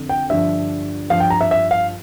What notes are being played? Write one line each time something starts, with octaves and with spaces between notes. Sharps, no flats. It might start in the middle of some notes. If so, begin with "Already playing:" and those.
Already playing: F2 D3 F3
G5
G2 D3 F3 E5
G2 F3 F5
G5
A#5
E5
E5
F5